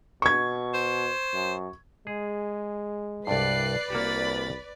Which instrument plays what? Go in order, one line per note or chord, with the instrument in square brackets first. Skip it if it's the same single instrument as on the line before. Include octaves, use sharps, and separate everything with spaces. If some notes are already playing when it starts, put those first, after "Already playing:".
[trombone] B2 [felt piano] C#6 G#6
[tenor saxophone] C5
[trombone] F#2
[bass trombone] G#3 [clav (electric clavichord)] G#4
[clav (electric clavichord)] C2 G2 [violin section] B4 D5 [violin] F#6 C7
[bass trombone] C2 [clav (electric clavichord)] A#3 F#4 G4 [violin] B5 A6